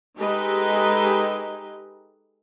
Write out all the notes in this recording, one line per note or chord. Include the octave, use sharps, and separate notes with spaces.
G#3 D#4 G4 A4 B4 D#5